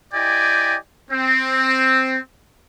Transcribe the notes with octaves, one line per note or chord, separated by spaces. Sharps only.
E4 G4 D5 D#5 G5 G#5
C4